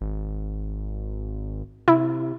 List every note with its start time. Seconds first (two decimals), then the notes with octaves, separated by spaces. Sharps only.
0.01 G#1
1.88 C3 E4